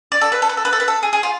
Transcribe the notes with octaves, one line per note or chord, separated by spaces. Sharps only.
D5
A4
B4
A4
B4
A4
B4
A4
B4
A4
G#4
G#4
F4